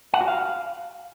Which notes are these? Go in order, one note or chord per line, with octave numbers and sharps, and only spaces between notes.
F#5
F#4
F5